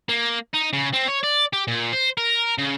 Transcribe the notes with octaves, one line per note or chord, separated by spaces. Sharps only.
A#3
D#4
C#3
C4
C#5
D5
G4
A#2
C5
A#4
C#3